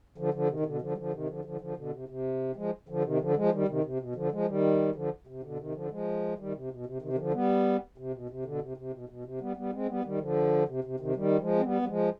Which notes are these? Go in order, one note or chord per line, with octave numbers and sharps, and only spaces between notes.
D3 F3
D3 F3
C3 D#3
C3
B2 D3
D3 F3
G3
D3 F3
C3 D#3
D3 F3
D3 F3
D3 F3
B2 D3
C3
C3
F3 G#3
D3 F3
C3 D#3
D3 F3
F3 G#3
D#3 G3
C3 D#3
C3
B2
D3 F3
F3 G#3
D#3 G3
D3 F3
C3
B2 D3
C3 D#3
D3 F3
F3 G#3
D#3 G3
C3
B2
C3
C3 D#3
D#3
D3 F3
G3 B3
C3
B2
C3
B2 D3
C3
C3
B2
B2
C3
G3 B3
G3 B3
G#3 C4
G3 B3
D#3 G3
D3 F3
C3
C3
C3 D#3
D#3 G3
F3 G#3
C4
G3 B3
G3
F3 G#3